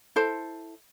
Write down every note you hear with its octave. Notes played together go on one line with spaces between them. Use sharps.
E4 A4 C5